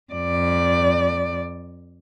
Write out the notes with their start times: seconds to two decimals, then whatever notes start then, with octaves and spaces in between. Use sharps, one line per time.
0.13 F2 D5